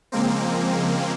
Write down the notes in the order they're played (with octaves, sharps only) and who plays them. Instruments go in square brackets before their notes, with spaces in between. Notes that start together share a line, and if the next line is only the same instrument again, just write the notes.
[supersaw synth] C#3 F3 G#3 A#3 C4